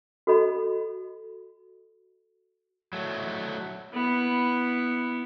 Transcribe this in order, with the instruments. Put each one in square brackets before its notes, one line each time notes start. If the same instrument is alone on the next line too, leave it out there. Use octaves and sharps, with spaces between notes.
[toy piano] F#4 A4 D#5 B5
[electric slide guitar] F#3 A3
[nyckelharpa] B3 E4